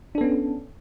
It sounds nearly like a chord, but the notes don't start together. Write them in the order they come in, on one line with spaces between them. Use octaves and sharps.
D4 A4 B3 C#4